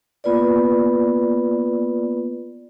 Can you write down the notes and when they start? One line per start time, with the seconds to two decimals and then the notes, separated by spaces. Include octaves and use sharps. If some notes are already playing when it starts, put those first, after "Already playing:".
0.24 A#3 B3 F4 B4 D5